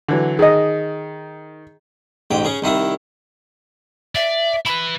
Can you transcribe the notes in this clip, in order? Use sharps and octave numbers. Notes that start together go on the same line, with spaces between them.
D3 E3 F#3
D#3 G#4 D#5
A1 G#2 G5
C#3 G#4
C2 D#3 E4 D#6
D5 E5
E4 B4 B5